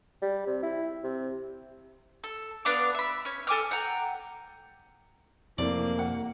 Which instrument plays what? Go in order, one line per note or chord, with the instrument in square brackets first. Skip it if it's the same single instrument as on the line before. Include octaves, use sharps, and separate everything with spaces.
[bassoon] G3
C3
E4
C3
[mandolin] A4
B3 D4 F5 D6
E5 B5
C#4 C#5
A4 G#5 D6 F6
F#5 G5 A#5
[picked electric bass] F1 F2 C3 [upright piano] C2 A2 E3 [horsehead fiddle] A#3 [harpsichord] D5
[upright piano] F#5